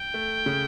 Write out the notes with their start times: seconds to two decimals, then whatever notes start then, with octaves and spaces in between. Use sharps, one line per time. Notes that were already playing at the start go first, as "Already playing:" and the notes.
Already playing: G5
0.14 A3
0.46 C#3